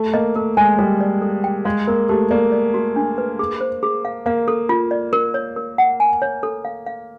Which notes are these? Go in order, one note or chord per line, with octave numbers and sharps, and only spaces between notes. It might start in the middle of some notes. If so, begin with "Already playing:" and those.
Already playing: A3
A#3 D#5
A3 A#4
G#3 G#5
G3 A4
D5
A4
G5
G#3 F5
A#3 A#4
A3 G4
A#3 D5
D5
F#4
D4
B4
G#4
C5
G#4
F5
A#3 F5
A4
F4
D5
A#4
C#5
A#4
F#5
G#5
C#5
A4
F5
F5